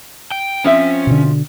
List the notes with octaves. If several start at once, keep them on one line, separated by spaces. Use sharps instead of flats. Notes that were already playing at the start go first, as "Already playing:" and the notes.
G5
F3 C4 C#4 E5
B2 D3